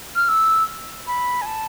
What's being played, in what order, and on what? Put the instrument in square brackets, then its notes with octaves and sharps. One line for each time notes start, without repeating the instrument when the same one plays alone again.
[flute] F6
E6
B5
G#5
A5